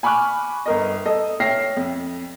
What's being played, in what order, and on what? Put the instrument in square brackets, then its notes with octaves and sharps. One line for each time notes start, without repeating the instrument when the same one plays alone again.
[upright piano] G#5 B5 C#6 D6 F6 F#6
G1 A#4 D#5
A4 D#5
C#5 E5 G5 F6 A#6 C7
F2